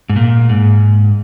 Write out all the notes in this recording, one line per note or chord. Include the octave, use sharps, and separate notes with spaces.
G#2
A#2
G#2